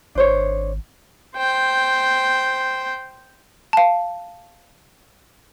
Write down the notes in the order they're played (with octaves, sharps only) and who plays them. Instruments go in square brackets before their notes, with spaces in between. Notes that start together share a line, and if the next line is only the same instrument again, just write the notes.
[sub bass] G#1 [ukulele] D4 C5 C#5
[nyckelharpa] C5 G5
[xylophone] F5 A5